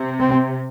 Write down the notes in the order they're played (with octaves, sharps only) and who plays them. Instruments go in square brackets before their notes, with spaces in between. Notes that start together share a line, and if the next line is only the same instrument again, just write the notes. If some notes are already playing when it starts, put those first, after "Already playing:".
Already playing: [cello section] C3
[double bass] C4